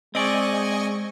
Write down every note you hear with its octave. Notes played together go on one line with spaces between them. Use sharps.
G#3 C4 D5 D#5 G#5 C#6